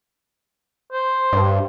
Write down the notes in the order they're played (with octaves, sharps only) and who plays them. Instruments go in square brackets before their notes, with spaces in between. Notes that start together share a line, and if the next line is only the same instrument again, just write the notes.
[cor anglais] C5
[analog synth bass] G2